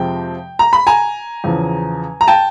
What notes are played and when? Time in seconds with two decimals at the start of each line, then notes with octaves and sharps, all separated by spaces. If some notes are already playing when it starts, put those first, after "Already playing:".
Already playing: F2 C3 F3 G#3 C4 G5
0.59 A#5
0.73 B5
0.87 G#5 A#5
1.44 E2 C#3 F3
2.21 A#5
2.28 G5 A5